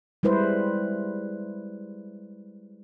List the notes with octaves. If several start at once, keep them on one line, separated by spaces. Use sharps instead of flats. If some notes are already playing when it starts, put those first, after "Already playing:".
G3 G#3 E4 B4 C5